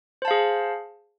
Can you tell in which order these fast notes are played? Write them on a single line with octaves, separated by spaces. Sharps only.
C5 A5 F5 G#4